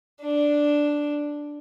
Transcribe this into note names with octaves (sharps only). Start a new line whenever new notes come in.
D4